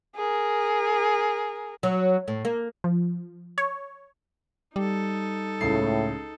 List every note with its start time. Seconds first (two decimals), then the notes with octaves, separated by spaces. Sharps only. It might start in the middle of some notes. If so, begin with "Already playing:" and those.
0.16 G#4 A#4
1.83 F#3
2.28 A2
2.45 A#3
2.84 F3
3.58 C#5
4.76 G3 D#4 A4
5.61 C#2 A2 C7